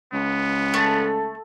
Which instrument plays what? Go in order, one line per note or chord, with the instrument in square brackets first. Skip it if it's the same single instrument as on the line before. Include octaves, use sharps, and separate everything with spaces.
[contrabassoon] C#2 [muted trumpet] B3
[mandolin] A3